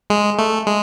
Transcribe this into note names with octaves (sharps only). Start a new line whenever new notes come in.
G#3
A3
G#3